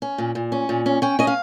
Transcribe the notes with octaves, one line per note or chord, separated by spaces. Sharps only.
C#4
A#2
A#2
C#4
A#2
C#4
C#4 G5
C#4 D#5
F5